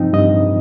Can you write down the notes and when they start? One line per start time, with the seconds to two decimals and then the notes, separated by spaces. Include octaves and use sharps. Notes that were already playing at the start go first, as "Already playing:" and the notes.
Already playing: G2 F3 C4 D#4 G5
0.13 G2 D#5